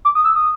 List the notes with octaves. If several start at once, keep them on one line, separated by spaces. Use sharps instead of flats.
D6
D#6
E6
D#6